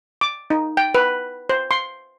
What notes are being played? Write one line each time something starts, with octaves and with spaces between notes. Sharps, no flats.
D6
D#4
G5
B4
C5
C6